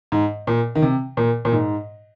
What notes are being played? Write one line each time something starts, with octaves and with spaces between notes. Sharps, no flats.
G#2
A#2
D#3
C3
A#2
A#2
G#2